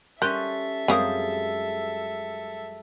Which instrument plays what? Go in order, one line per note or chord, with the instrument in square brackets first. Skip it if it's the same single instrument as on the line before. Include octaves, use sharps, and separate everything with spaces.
[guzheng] G3 C#4 [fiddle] A4 E5 [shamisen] A#4 [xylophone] C6 F#6 G6
[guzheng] F#2 G3 G#3 [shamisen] C4 C#4 A#4 [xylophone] F5 D#6